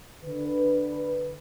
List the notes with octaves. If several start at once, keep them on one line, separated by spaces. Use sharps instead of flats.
D3 B4